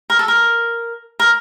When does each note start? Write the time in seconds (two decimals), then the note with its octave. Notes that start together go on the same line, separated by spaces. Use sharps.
0.10 A#4
0.19 A4
0.28 A#4
1.20 A#4